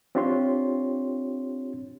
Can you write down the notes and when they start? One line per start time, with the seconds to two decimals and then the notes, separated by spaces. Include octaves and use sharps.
0.15 C4 D4 F4 G4 C#5 C6